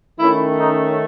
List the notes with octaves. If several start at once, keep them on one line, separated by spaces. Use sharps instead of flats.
D#3 A3 C#4 E4
D#4